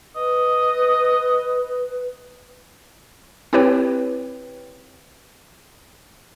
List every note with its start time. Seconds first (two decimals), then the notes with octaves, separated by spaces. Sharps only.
0.16 B4 D#5
3.53 C4 E4 G4 B4 C#5 G5